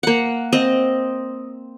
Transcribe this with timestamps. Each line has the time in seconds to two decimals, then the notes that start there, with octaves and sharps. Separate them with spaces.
0.03 A#3 F#5
0.52 C4 D#5